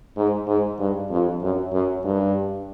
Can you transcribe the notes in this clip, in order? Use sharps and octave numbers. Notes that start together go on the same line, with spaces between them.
G#2
G#2
G2
F2
F#2
F#2
G2